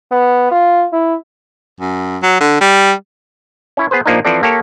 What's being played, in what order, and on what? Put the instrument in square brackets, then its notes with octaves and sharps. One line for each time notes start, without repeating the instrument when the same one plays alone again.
[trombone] B3
F4
E4
[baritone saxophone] F#2
F#3
D3
G3
[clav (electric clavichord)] C#4 E4 C#5
B3 G#4 B4 C5
A#2 F3 A#3 D4 D#4
E3 F3 C4 A4 D5
A#3 G4 A4 C#5